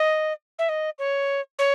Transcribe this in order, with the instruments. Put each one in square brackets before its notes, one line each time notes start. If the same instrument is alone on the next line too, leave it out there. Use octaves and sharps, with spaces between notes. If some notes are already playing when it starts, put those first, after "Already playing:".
Already playing: [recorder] D#5
E5
D#5
C#5
C#5